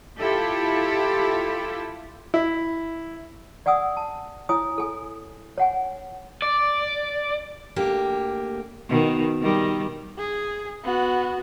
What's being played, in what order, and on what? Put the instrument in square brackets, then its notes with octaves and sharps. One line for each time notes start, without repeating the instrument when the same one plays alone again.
[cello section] E4 F4 G4 A4
[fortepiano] E4
[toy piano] D5 F#5 G#5 D#6 E6
A5
E4 C#5 G#5 D#6
A4 G#5
C#5 F#5 G#5
[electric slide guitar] D5
[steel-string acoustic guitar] D2 A#3 G4
[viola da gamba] B2 D#3
D#3 G3
[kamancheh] G#4
B3 F#4